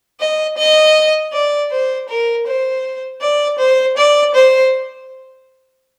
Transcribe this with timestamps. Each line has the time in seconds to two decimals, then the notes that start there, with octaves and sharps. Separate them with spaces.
0.20 D#5
0.57 D#5
1.33 D5
1.71 C5
2.09 A#4
2.47 C5
3.21 D5
3.59 C5
3.97 D5
4.34 C5